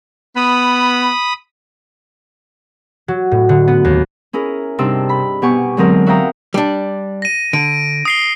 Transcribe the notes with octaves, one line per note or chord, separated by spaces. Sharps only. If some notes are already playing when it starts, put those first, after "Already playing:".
B3 B5 D#6
F#3
A2
D3
B3
D#2
C#4 E4 G#4 A#4
G2 C3 D4 D#4 C6 E6
B5
B2 B3 G4 G#5 C#6
D3 F#3 G#3 C4 G#4 A#4
F#4 E5 F5 G5 A#5 D#6
G3 D4
A#6 D#7
D3 D7
D#6 C7 G7